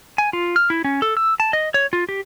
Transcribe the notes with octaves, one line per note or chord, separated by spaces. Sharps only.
G#5
F4
F6
E4
C#4
A4
E6
A5
D#5
C#5
F4
G4